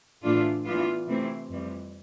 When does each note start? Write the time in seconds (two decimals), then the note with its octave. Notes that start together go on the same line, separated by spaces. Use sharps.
0.22 A2 E3 A3 D4 F4
0.65 E3 B3 D4 F4
1.07 C3 E3 A3 C4 E4
1.50 F2 E3 G3